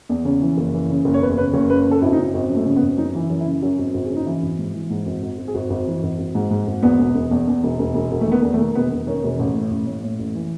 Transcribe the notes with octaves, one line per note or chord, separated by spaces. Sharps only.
E2
C#3
E3
F#1
E3
C#3
F#1
C#5
E2 B4
C#3 B4
F#1 C#5
C#3 B4
C#3
A4
G#1 E4
D#4
C#3
G#1
F#2
A3
C#3
B3
G#1
F#2 D#4
E3 E4
F#2
E4
C#3
F#2 F#4
G#1
G#1
G#4
C#3
D#4
E3 E4
G#1
G#2
E3
G#2
G#1
G#1
G#1
G#4
G#1 F#4
G#1
E3
G#1
G#1
G#2
G#2
G#1
E2 B3
E1
E1
E2
E2
E1
E1
E1
E1
A3
D#3 B3
E2
A3
D#3
E1 B3
E1
D#3 C#4
E1
A1
A2
A1
A2
A2
A1
E3